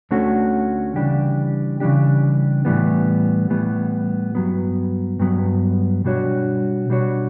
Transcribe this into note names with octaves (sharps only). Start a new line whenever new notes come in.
D2 D3 A3 C#4 F#4
C#3 E3 G3 D4 G4
C#3 E3 G3 D4 G4
A2 E3 G3 B3
A2 E3 G3 B3
G2 F#3 B3
G2 F#3 B3
B2 G3 D4 F#4 C#5
B2 G3 D4 F#4 C#5